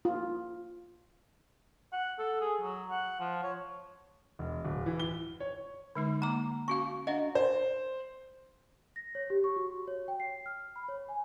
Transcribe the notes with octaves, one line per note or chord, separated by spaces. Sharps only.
F4
F#5
A4
G#4
F#3
F#5
F3
C#5
E1
D1
E3
G7
C#5
D3 G#3 D#4
A#3 A#5 D6
C#4 F#4 F5 C#6
D4 D#5 F5 F#5
C5
A#6
C#5
G4
C#6
F#4
C#5
G5
C7
F6
B5
C#5
G#5